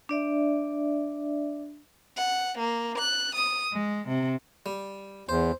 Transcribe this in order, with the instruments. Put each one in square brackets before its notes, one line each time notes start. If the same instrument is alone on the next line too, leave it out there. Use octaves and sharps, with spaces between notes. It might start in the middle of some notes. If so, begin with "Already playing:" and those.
[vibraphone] D4 D5 E5
[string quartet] F#5
A#3
F#6
D#6
G#3
C3
[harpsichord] G3
[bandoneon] E2 [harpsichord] C5